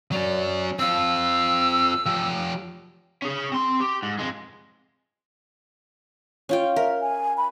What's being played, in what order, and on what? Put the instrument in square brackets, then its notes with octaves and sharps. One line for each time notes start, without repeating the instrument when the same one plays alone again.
[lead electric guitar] F#3 C#4 [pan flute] D5
[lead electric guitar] C4 F4 [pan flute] E6
[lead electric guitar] F3 G4
[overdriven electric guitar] C#4 G#4
C4 C6
G4
G#2
F2 G#3
[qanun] C#4 F4 G5
[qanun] A#4 [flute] E5
[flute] G#5
B5